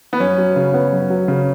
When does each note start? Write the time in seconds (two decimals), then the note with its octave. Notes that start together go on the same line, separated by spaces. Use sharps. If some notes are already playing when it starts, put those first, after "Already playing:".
0.13 B3
0.20 F#2 C#4
0.38 F#3
0.56 C#3
0.74 B3
0.92 F#2
1.10 F#3
1.28 C#3